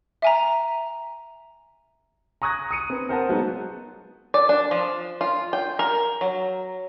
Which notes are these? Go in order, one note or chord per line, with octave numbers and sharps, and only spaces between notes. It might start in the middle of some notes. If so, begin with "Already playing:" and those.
E5 G#5 A#5
A#5 C#6 D#6 F#6 G#6 A#6
D#6 C#7 D#7
C4 B4
A#4 C5 F#5 A5
F#3 G#3 B3 D#4
D5
D4
F3
F4
G5
A#4
F#3